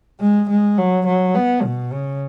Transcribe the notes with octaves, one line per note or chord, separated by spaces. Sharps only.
G#3
G#3
F#3
F#3
B3
B2
C#3